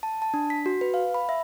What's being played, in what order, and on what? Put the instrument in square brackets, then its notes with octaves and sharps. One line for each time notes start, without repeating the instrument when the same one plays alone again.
[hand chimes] A5
A5
D4
B6
F#4
B4
F5
B5
E5